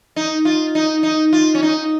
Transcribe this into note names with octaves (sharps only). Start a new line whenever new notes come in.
D#4
F4
D#4
D#4
F4
C#4
D#4